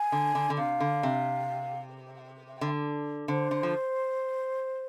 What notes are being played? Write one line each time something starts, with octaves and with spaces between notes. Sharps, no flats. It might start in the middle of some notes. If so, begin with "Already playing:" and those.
Already playing: G#5
D3
D3
D3
C3 F5
D3
C3
D3
D3 C5
D3
F3